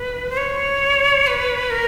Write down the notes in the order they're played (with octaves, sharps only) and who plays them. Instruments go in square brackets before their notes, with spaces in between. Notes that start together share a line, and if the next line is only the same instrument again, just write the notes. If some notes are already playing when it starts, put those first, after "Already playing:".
Already playing: [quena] B4
C5
C#5
B4
A#4